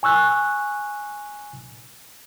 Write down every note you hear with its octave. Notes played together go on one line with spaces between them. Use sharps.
G#5 C#6 E6 F#6